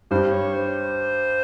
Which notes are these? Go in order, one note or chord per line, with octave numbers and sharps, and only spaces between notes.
G2 G3 C5
C#5
C5